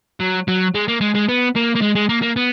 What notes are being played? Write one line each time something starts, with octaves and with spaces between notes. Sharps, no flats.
F#3
F#3
G#3
A#3
G#3
G#3
B3
A#3
A#3
G#3
G#3
A#3
A#3
B3